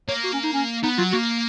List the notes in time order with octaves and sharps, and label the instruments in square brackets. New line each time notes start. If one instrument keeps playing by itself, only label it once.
[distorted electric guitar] A#3 [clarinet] C#5
[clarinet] F#4
C#4
D#4
C#4
[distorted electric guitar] B3 [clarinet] D#4
[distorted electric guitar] F#3 [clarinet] F4
[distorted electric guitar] A#3 [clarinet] F#4